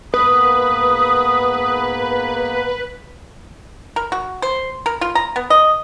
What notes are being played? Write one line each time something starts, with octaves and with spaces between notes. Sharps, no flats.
G#2 A#3 B3 B4 D#6
A#4
F#4
C5
A#4
F4
A#5
B3
D#5